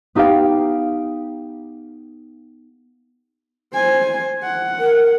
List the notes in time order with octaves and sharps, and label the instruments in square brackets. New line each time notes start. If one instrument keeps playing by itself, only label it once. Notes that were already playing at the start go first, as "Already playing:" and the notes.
[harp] B3 D#4 G4 F5 G5
[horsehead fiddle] C5 G#5
F#5
[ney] A#4